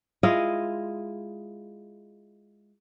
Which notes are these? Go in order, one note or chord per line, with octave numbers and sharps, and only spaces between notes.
G#3 E4 F4 D#5